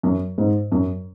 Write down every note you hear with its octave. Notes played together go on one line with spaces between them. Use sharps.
F#2
G#2
F#2